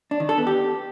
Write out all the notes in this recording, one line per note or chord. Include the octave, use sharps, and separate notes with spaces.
D4
D#3
A4
B3
G4